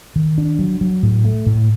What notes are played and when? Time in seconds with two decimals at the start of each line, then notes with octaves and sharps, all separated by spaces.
0.16 D#3
0.38 D4
0.59 F#3
0.81 F#3
1.03 A2
1.25 A3
1.46 A2